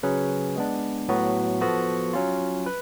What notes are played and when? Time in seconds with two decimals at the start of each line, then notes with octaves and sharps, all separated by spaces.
0.03 C#3 F#3 C#4 G#4 B4
0.56 G#3 B3 D4
1.09 A2 F#3 B3 F#4
1.61 F3 B3 F#4 A4
2.13 F#3 C#4 F4
2.66 B4